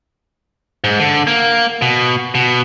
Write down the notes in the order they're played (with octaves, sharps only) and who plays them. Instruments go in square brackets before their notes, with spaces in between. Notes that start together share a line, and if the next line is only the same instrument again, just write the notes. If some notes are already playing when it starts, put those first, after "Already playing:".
[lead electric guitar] G#2
D3
A#3
B2
B2